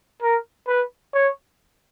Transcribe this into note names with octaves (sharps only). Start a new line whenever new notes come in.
A#4
B4
C#5